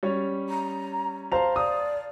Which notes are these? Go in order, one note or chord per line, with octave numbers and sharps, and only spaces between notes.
G3 C#4 C#5
A#5
C5 F5 A5 A#5 F7
D5 D#6